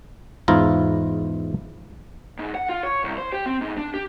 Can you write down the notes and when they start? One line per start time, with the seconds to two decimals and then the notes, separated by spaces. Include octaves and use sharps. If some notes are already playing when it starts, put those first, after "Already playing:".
0.48 E2 G#2 E4 F4 A#5
2.39 G#2
2.55 F#5
2.69 F4
2.83 C#5
3.04 C2
3.18 C5
3.33 G4
3.46 C4
3.61 G#2
3.78 D4
3.94 G4